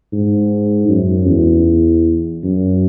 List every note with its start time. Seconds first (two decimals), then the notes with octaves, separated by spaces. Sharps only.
0.12 G#2
0.89 F#2
1.28 E2
2.44 F#2